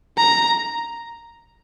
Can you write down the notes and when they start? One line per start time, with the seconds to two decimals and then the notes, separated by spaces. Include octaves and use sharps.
0.17 A#5